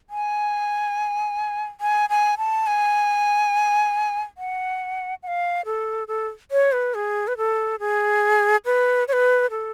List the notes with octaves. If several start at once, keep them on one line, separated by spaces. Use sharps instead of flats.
G#5
G#5
G#5
A5
G#5
F#5
F#5
F5
A4
A4
C#5
B4
G#4
B4
A4
G#4
B4
C#5
B4
A4